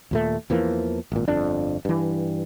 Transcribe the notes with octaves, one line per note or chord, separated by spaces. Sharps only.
D#2 A#2 A3
E2 E3 F3 A#3
G#1 A#2
G1 F2 D4
G2 E3